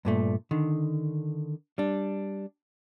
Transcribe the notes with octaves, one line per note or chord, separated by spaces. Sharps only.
G2 A#2 A3
D3 D#3
G3 D4